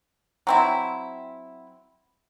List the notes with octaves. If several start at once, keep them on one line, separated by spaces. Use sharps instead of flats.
F#3 C4 E4